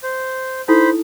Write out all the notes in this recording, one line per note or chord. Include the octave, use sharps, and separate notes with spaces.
C5
D#4 E4 A4 C5 B5